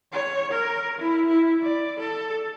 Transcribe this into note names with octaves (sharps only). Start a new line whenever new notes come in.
C#5
A#4
E4
E4
D5
A4